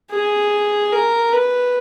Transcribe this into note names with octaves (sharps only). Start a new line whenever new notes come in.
G#4
A#4
B4